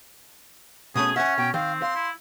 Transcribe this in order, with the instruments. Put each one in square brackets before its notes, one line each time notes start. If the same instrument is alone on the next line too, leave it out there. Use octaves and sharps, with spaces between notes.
[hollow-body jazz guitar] B2 A3 C#4 [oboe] G#4 [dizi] D#6
[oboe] C#4 [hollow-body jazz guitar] E5 G#5 [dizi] F#5
[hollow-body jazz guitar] B2 [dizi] G5
[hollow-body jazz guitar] D#3 [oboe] C4 [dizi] F5
[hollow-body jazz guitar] F5 [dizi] C6
[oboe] E4